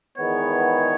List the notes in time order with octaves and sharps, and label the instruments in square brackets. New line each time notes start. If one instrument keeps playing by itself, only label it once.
[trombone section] E2 D#3 G#3 B3 [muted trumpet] C#5